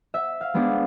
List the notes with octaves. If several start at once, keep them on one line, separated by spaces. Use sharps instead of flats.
E5
F5
G#3 B3 D4 G4 G#4